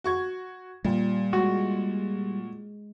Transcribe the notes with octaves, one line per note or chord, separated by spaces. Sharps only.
F#4 C#6 G#6
A#2 G3
G#3 F#4